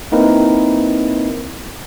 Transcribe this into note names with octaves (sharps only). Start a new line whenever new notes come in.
A#3 C4 D#4 E4 A#4 B4